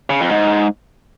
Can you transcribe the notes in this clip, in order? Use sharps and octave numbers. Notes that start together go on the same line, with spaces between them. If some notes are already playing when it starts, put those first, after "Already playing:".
C#3
F2
G#2